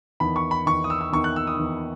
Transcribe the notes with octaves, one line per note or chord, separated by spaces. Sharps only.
E2 D#3 B5
C#6
B5
E2 D#3 C#6
D#6
E6
E6
E2 D#3 C#6
F#6
E6
D#6
E2 D#3